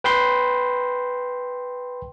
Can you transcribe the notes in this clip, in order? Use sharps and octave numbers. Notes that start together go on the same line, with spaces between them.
B4 G5 B5 C6